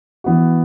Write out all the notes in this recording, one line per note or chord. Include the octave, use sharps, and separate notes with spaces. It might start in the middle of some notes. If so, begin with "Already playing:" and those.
E3 B3 F#4